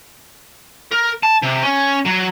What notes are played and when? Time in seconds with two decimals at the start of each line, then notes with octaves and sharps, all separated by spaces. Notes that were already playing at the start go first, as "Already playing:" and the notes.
0.92 A#4
1.23 A5
1.42 C3
1.62 C#4
2.05 F#3